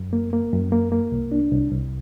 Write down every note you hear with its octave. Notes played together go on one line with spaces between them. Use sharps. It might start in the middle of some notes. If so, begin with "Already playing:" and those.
Already playing: F#2
A#3
A#3
F#2
A#3
A#3
C2
D4
C2
C2